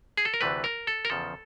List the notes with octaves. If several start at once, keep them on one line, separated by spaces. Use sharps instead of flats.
G#4
A4
A#4
D2 C3 E3 A3 B4
A#4
A4
A#4
E2 C#3 F3 A4